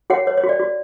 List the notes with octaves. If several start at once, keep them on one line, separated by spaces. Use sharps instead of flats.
F#4 C#5 F#5
C#5
C#5
F#4
D5
F#4